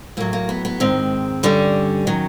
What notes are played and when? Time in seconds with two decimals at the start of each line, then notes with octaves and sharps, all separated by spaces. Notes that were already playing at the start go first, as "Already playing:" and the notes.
0.17 A2 F#3 A#3
0.33 A#3
0.49 B3
0.65 B3
0.80 G#2 D#3 G#3 C4
1.43 G2 D3 G3 C#4
2.07 D#3 F#3